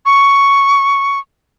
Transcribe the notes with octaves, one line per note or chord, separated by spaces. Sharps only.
C#6